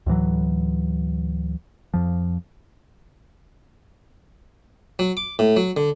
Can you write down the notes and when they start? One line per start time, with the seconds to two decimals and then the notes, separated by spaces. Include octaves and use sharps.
0.06 D2 A2 E3 F#3
1.94 F2 F3
4.99 F#3
5.17 D6
5.39 A2
5.57 F#3
5.77 D3